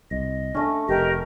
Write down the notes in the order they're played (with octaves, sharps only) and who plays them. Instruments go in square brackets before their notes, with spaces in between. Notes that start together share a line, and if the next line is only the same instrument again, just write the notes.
[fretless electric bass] C2 [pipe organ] D#5
[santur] A3 C#4 [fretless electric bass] D4
[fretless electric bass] F1 [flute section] G4 A#4 [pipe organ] D#5